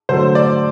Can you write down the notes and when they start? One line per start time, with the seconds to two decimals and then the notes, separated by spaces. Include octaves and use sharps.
0.09 D3 F#3 A3 C5
0.35 D5